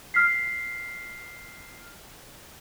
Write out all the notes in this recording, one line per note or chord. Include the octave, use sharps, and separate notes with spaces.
F6 B6 C7